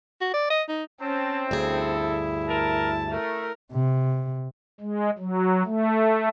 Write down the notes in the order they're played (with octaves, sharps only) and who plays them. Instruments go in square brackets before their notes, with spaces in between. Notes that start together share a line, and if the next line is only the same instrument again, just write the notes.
[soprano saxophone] F#4
D5
D#5
D#4
[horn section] C4 [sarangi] C#4 [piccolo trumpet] A5
[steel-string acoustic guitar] D2 G2 G#4 [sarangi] E4 [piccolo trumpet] A4
[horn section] A#4 [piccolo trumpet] A5
[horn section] A3 [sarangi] A#4
[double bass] C3
[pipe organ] G#3
F#3
A3